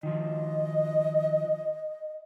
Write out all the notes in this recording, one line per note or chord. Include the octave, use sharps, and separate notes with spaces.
D#3 F3 D#5